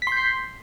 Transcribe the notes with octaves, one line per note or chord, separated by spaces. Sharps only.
C6 G6 B6 C7